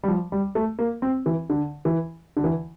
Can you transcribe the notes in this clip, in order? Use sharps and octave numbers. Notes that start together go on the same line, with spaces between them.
G3
F3
G3
A3
A#3
C4
E3
D3
E3
D3
E3